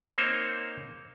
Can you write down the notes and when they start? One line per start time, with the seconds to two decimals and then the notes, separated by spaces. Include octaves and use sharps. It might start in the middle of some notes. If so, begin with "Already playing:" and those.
0.18 A#3 C4 D#4 C5 C#5